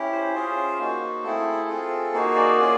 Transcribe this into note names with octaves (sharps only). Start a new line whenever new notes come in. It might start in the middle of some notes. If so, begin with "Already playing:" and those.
Already playing: C#4 E4 G4
C5
C#4 F4 G#4
A#3 D#4 F#4
A3 C4 E4 G#4 A4
C4 F4 G#4
A#3 D#4 F#4 G#4
D5
A#3 C#4 F4 G#4